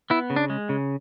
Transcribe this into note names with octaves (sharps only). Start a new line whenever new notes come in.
B3 E4
C#3
D4
G#3
C#3